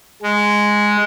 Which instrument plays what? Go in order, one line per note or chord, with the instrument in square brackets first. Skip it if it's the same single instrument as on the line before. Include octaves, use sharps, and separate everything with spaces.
[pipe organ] G#3